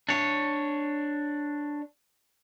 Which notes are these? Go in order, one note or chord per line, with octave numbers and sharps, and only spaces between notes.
D4 C#5